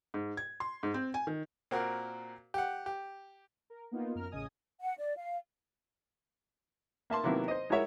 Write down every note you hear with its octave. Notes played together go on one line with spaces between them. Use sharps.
G#2
G#6
C6
G#2
C4
G#5
D#3
A#2 C4 F#4 A#4
G4 F#5
G4
A#4
A#3 B3 D#4 F4
F#2 A#4 F6
A1 C#3 D#5 G#5 D#6
F#5
D5
F5
A#3 E5 A5 C6
C3 D#3 F#3 A#3 B3 E4
C5 D#5
G#3 E4 F#4 A#4 C#5 E5